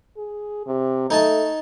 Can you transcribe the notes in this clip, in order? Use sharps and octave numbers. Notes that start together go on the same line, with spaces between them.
G#4
C3
A3 D#4 G#5 A5